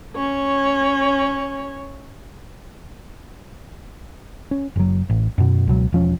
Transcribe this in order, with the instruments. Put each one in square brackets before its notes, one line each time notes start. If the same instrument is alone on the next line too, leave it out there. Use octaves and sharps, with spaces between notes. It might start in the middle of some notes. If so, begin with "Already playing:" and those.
[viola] C#4 C#5
[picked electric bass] C#4
F#1 F#3
A1
F#2 B2
C#2 B2 F#3
E1 F3 C#4